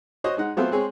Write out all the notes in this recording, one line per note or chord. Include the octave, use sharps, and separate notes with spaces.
F#4 C5 C#5 D#5
G#3 D#4 F#5
F#3 A3 B3 C4 F4 C5
G#3 C4 G#4 C#5